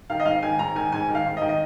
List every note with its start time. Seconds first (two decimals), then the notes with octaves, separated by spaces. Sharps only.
0.10 D#3 F5
0.20 D#5
0.25 G#2 F5
0.43 D#3 G#5
0.59 G#2 A#5
0.75 D#3 G#5
0.92 G#2 G#5
1.09 D#3
1.15 F5
1.26 G#2
1.37 D#5
1.41 D#3
1.49 D#5